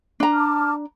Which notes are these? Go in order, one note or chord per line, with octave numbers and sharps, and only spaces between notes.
D4 A#5
A5 D6 F6